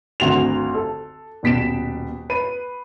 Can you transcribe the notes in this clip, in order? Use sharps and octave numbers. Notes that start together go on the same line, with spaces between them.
G#1 D2 F#4 F7
A4
D#1 B2 B6 D7 E7
B4 D#7